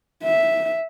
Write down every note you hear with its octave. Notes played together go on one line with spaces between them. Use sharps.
E5